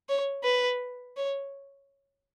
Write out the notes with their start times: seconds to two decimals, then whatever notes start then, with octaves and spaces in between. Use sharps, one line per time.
0.09 C#5
0.44 B4
1.16 C#5